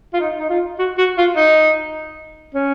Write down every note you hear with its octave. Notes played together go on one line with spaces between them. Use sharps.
F4
D#4
D#4
F4
F#4
F#4
F4
D#4
C#4